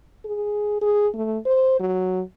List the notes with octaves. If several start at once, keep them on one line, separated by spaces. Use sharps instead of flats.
G#4
G#4
A3
C5
F#3